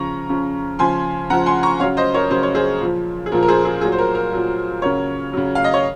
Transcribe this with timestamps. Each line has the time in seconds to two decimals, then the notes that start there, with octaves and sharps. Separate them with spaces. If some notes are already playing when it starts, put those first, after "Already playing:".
Already playing: C#3 F3 A#5 C#6
0.29 C#3 F3
0.79 C#3 F3 G#5 C6
1.30 C#3 F3 F#5 A#5
1.46 G#5 C6
1.63 A#5 C#6
1.80 C#3 F#3 C#5 F5
1.97 C5 D#5
2.14 A#4 C#5
2.31 C#3 F#3 C5
2.43 C#5
2.55 G#4 C5
2.81 A#2 F3
3.26 G#4
3.32 A#2 F3 A#4
3.43 A#4
3.48 G#4 C5
3.65 G#4
3.81 A#2 F#3 G#4
3.92 C5
3.98 A#4
4.15 A#4
4.33 A#2 F#3
4.82 C#3 F#3 A#4 C#5
5.33 C#3 F#3
5.55 F5
5.64 D#5
5.74 C#5